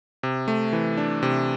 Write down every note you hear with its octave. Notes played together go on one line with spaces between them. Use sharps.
C3
A3
E3
D4
C3